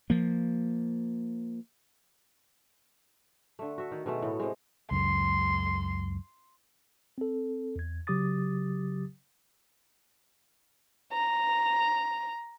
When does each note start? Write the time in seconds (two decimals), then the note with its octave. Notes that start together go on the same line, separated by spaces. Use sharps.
0.10 F3 A#3
3.59 D3 A3
3.78 F#4 E5
3.92 D#3
4.06 B2 D#3 G#3 A3
4.22 A2 B3
4.39 C3 G#3
4.91 C#2 F#2 C6
7.18 C4 A4
7.76 E2 G#6
8.07 C#3 F#3 G4 D6 D#6 A6
11.13 A#5